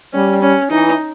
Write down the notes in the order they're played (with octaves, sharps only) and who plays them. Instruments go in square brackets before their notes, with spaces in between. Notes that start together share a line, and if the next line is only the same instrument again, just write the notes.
[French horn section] G3 [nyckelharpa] C#4
[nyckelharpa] C#4
[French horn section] E3 [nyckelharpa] D#4